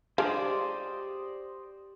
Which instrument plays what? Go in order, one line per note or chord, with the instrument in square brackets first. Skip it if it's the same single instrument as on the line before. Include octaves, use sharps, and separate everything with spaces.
[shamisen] G#3 D4 F4 [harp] G4 [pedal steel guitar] C5 D5 D#5